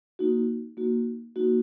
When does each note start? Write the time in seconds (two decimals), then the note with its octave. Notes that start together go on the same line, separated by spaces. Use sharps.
0.19 A#3 D#4 F#4
0.77 A#3 D#4 F#4
1.36 A#3 D#4 F#4